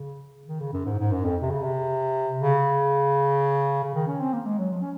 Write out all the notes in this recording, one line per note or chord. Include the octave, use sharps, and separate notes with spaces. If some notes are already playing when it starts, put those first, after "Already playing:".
Already playing: C#3
D#3
C#3
F#2
G#2
G#2
F#2
F2
C3
C#3
C3
C#3
C#3
D#3
C#4
C4
A#3
G#3
F#3
F3
C#4